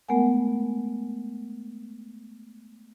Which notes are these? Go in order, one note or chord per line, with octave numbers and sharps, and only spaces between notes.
G#3 A3 B3 A#4 F#5 G#5